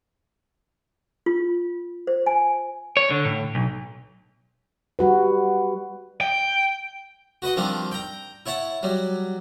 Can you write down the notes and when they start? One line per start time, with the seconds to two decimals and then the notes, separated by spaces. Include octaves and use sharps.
1.26 F4
2.07 C5
2.26 G#5
2.97 C#5
3.11 D3
3.25 A2
3.55 B1
4.99 G3 F#4 B4
6.21 G5
7.42 F#4 B4 D#5 F#5
7.56 D#3 F3 G3 C4 D4
7.92 G5 A#5
8.46 E4 C#5 F#5 A5
8.83 F#3 G3